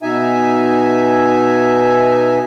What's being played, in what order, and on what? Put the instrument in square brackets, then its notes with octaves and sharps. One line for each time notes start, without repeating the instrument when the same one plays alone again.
[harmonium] B2 D#4 E5 G#5